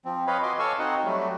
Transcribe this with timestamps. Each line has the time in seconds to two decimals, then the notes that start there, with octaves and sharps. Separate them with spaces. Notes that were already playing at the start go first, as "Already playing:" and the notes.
0.05 F3 C4
0.27 B4 C#5 D#5 F5 B5
0.43 F#4 D#5 G#5 C6 D6
0.59 A4 C#5 F5 G#5 C#6 E6
0.79 C4 D#4 F#4 D#5 F#5
1.04 F#3 G3 A3